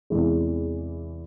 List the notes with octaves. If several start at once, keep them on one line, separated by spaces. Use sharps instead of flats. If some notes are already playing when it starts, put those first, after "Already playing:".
E2 C3 E3 G#3